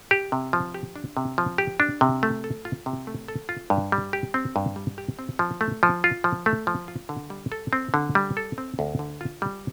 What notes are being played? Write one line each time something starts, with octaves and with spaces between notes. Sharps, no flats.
G4
C3
F3
G4
D4
C3
F3
G4
D4
C3
A3
A4
F4
C3
A3
A4
F4
G2
G3
G4
C4
G2
G3
G4
C4
F3
A3
F3
F4
F3
A3
F3
F4
D3
G3
A4
C4
D3
G3
A4
C4
D2
D3
F4
G3